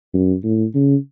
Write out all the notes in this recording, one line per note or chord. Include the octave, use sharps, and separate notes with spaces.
F#2
A2
C#3